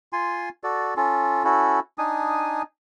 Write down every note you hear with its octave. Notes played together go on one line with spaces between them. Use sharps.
F4 G#5 C6
F#4 A4 D5
C#4 F4 A4
C#4 E4 F#4 A4
D4 D#4 G#5 D#6